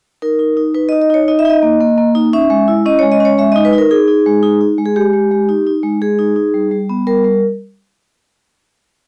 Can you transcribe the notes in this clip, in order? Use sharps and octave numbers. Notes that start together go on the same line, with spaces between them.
D#4 A#4
D#4
D#4
D#4 B4
D#4 D#5
D#5
D#4 C#5
D#4 D#5
E5
D#4 D#5
A#3
A#3
A#3
D#4
C#4 E5
G#3
E4
C#4 D#5
G#3 C#5
D#5
C#4 C#5
G#3 E5
D#4 D#5
B4
D#4
A#4
D#4 G#4
D#4
G#3
D#4
D#4
G#3
G#4
G#3 G4
G#3
G#3
D#4
D#4
G#3
G#3 G#4
D#4
D#4
G3
G3
B3
G3 A#4
G3